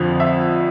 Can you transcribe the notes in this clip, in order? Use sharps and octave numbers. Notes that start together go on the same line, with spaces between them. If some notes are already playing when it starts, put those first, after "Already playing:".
Already playing: F2 D3 F3
E5